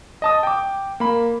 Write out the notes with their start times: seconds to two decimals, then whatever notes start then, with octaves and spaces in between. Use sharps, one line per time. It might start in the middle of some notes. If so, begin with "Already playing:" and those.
0.22 D#5 A5 D#6
0.43 G5 D6
1.00 A#3 B5